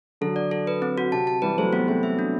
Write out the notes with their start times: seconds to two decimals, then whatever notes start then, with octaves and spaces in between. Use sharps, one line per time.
0.21 D3 F#3 A4
0.36 D5
0.51 A4
0.67 B4
0.82 C4
0.98 F#4
1.12 C3 A5
1.27 A5
1.42 E3 G3 B4
1.58 F#3 A3 C5
1.73 G3 B3 F#4
1.88 A3 C4 C5
2.03 E5
2.19 D4